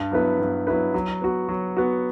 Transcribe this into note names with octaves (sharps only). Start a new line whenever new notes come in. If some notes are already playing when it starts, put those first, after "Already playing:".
Already playing: G2
F#3 B3 E4 B4
G2
F#3 B3 E4 B4
F#3
B3 F#4
F#3
B3 F#4